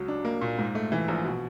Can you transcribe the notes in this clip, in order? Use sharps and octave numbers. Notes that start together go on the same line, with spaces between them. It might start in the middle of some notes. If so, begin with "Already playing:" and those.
Already playing: C#2 F#3
D4
A#3
A#2
G#2
A3
E3
A#1
B2